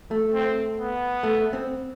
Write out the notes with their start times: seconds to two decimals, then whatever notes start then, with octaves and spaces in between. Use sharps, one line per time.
0.11 A3
0.34 C4
0.78 B3
1.23 A3
1.53 C4